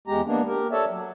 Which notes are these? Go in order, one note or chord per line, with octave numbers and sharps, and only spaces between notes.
E2 G#3 G4 A#5
A#3 B3 D4
G4 A#4
A4 C#5 D5 E5
F#3